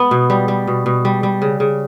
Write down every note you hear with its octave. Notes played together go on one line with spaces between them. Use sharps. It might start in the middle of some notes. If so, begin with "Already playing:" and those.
Already playing: B3
B2
G3
G3
B2
B2
G3
G3
C#3
C#3